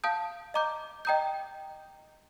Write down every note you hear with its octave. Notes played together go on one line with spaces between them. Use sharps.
F5 A5 D#6 G6
D#5 A#5 D6 G6
D#5 G5 A#5 D#6 G6